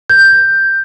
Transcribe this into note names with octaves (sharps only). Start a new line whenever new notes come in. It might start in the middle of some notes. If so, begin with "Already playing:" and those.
G6